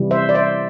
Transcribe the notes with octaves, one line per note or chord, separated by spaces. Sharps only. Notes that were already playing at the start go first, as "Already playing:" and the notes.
Already playing: C3 E3 G3
C5 E5
D5
C5 E5